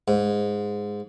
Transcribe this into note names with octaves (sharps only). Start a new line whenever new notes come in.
G#2